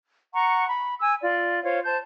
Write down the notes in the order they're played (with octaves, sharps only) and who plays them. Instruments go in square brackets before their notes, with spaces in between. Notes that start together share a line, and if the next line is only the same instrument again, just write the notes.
[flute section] F#5 A#5 C#6
B5
G#5 E6
F4 D5
F4 C5 C#5 F5
C5 A5 G6